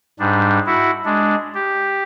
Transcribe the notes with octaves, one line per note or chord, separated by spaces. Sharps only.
G#2 G3 D4
E4 F#4
G#3 D4
G4